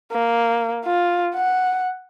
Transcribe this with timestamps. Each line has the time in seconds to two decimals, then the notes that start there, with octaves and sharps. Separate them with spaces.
0.12 A#3
0.85 F4
1.35 F#5